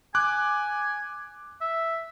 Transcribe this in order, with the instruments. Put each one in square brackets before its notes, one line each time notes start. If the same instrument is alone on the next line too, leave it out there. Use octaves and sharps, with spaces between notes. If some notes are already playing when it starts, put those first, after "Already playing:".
[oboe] G#5 [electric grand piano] D6 F#6
[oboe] E5